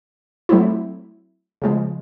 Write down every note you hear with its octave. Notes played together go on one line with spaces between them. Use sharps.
F#3 A3 C4 E4
C#3 F3 G#3